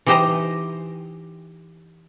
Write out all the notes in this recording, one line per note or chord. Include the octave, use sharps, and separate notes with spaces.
E3 D#4 G4 C5 D#5 A#5